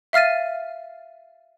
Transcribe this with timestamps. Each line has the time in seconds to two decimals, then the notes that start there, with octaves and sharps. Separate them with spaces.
0.13 E5 F5 F6 A6 D#7